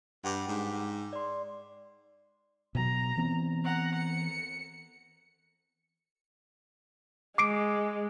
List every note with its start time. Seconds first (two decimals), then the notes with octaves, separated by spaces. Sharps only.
0.24 G2 F#5 G5 D6
0.48 G#2
1.13 D5 C6
2.75 B2 F#3 A#5
3.17 E3 B3 C4
3.64 F#5 A#5
3.96 C#7
7.38 G#3 D6 C7 D7